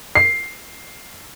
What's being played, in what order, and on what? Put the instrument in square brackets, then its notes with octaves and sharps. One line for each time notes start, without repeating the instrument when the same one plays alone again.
[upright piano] C7